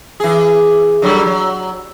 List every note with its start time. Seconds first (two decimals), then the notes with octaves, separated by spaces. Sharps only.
0.20 E3 G#4
1.02 D3 F#3 G3
1.26 F#3